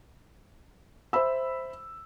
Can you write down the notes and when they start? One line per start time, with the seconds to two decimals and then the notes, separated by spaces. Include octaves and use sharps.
1.13 C5 E5 B5 E6